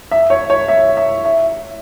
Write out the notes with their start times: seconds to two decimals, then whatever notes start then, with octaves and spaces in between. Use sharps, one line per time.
0.11 E5
0.30 C#5
0.50 C#5
0.68 E5
0.97 E5
1.25 E5